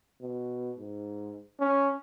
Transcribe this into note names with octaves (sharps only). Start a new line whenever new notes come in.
B2
G#2
C#4